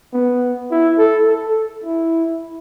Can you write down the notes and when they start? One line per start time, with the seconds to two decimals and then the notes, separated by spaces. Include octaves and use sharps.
0.13 B3
0.71 E4
0.98 A4
1.28 A4
1.84 E4